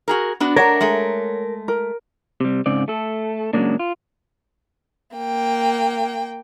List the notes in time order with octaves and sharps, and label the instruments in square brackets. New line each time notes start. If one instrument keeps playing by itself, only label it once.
[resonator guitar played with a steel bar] F#4 G#4 A#4
B3 D4 F#4
[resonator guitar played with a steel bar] A3 D4 [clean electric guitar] A#4 [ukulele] C#5 F#5 A#5
[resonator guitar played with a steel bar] G#3 A3
[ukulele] A#4
[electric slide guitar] C3 G3
G#2 C#3 C4 D5
A3 A4
F#2 C#3 F#3 G#3 A#3 D4
F4
[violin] A#3 G5